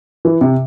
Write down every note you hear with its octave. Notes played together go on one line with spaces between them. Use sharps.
E3
C3